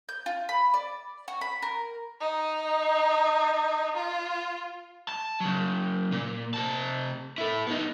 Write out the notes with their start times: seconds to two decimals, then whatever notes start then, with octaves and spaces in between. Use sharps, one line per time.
0.09 G6
0.26 F4
0.49 B5
0.74 D5
1.28 F#4
1.41 B5
1.62 A#4
2.21 D#4
3.96 F4
5.09 A5
5.40 C#3 F#3
6.12 A#2
6.54 C3 A5
7.38 E4 A4
7.67 B3 D#4